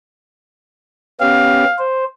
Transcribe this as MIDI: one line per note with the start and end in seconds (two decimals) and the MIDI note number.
1.20 1.64 59
1.20 1.64 61
1.20 1.64 67
1.20 1.83 77
1.78 2.04 72